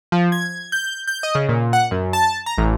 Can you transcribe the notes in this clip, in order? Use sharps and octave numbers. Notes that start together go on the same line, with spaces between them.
F3
G#6
G6
G6
D#5
C#3
A#2
F#5
F#2
A5
A#5
A1